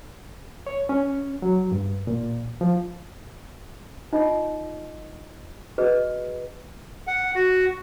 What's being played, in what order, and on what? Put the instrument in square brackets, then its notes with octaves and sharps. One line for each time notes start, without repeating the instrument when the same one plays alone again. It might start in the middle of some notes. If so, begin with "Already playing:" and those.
[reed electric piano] C#5
C#4
F#3
G2
A#2
F3
[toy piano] D#4 F4 D#5
F#4 G#4 B4 D#5
[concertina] F#5
F#4